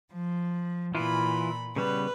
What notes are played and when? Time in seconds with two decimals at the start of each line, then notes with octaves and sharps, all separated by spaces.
0.12 F3
0.95 A#2 E3 E4 F4 B5
1.76 C#3 G3 B3 B4